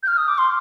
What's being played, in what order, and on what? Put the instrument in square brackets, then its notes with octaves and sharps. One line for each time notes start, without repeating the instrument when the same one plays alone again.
[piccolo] G6
F6
D#6
D6
C6